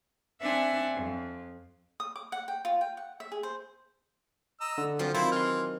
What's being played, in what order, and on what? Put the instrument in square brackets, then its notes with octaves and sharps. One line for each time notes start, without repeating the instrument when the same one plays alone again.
[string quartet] C4 D4 E5 F#5 G#5 A5
F2
[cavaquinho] D#6
D6
F#5
G5
F4
G5
F#5
E5
G#4
C5
[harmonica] D#5 A#5 E6
[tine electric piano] D3
[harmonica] F3 [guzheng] F#3 C4 F4
[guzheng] D#3 [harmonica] E4 C5 [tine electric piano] F4
[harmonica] E3 [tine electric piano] C6 F6